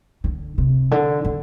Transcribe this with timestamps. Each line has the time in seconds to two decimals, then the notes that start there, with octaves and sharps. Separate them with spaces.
0.24 D3
0.58 C3
0.91 D3
1.25 D3